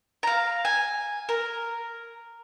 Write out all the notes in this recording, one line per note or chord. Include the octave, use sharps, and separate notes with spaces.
F5 A#5
G#5
A#4